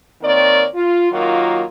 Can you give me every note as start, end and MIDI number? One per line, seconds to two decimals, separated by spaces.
0.22 0.65 51
0.22 0.65 58
0.22 0.65 60
0.22 0.65 70
0.22 0.65 73
0.22 0.65 74
0.74 1.09 65
1.12 1.63 51
1.12 1.63 54
1.12 1.63 58
1.12 1.63 65